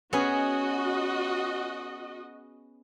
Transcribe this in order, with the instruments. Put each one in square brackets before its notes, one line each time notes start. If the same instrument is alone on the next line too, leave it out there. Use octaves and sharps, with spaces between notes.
[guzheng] B3 C#4 G#4 [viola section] F#4 D#5